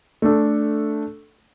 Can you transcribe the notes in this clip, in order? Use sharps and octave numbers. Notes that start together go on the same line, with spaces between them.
A3 D4 A4